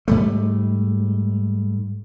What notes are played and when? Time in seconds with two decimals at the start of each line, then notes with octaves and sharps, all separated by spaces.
0.08 G#2 G3 A3